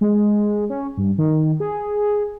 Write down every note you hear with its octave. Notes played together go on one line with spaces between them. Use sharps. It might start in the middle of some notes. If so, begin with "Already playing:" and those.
G#3
C#4
G2
D#3
G#4